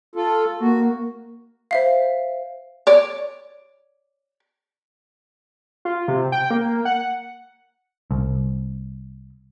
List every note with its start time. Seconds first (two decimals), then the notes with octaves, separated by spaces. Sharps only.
0.15 F4 A4
0.60 A#3 F#4
1.71 C5 E5 F5
2.87 C#5 D5
5.85 F4
6.08 C3
6.32 G5
6.50 A#3
6.85 F#5
8.11 C2